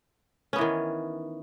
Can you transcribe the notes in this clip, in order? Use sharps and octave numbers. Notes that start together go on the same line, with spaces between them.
D#3 E3 B3 C#4